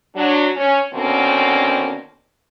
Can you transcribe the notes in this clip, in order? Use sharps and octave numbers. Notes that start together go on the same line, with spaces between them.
F#3 D4
C#4
B2 D3 D#3 A#3 C4 C#4